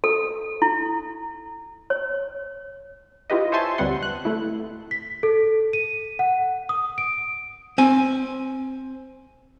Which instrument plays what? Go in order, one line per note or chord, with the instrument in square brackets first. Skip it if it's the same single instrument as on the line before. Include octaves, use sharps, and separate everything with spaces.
[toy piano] A4
E4
C#5
[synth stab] E4 F4 G4 B4 D#5
C5 C#5 E5 G#5 A5 C6
D2 G3 B3 C4 F#5 C6
F#6
A3 E4
[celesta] B6
A4
D#7
F#5
D#6
D7
[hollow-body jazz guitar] C4 G#5